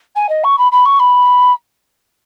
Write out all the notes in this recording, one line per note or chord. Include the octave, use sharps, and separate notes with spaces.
G#5
D#5
C#6
B5
B5
C#6
B5